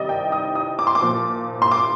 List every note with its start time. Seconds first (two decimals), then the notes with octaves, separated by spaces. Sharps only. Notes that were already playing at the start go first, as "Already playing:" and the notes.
Already playing: C3 D#3 G3 D5 D#5
0.09 G5
0.32 D#6
0.55 D#6
0.79 D6
0.87 C6
0.95 D6
1.02 A#2 F3
1.62 C6
1.72 D6